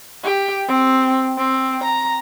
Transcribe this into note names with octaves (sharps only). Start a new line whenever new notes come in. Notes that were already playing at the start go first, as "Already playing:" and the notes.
G4
C4
C4
A#5